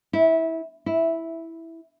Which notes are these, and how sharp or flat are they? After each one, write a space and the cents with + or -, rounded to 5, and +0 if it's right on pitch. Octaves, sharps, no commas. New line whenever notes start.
E4 -20
E4 -5